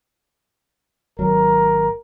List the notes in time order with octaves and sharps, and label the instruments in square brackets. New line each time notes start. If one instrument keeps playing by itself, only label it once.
[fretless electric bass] G#1 F#3 [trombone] A#4